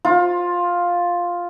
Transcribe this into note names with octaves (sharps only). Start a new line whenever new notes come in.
F4